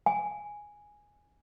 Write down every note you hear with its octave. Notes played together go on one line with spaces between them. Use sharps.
G#5